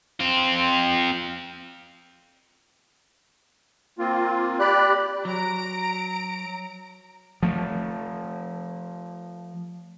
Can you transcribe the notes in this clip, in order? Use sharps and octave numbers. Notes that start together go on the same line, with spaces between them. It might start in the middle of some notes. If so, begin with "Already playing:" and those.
C4 F4
A#3 C4 F4
G4 D5 B5 F#6
F#3 A#5 D7
F3 A3